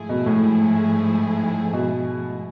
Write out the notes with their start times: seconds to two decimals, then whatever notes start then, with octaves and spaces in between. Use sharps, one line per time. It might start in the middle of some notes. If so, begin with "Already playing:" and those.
Already playing: G#2 F3 A3 E4 G#4
0.09 B2
0.26 A2
1.73 B2